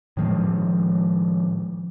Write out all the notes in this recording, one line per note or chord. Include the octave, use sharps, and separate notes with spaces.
A2 D#3 F3 G#3